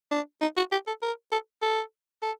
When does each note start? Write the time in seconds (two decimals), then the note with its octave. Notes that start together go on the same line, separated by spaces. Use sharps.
0.11 D4
0.42 D#4
0.57 F#4
0.72 G4
0.87 A4
1.02 A#4
1.32 A4
1.62 A4
2.22 A4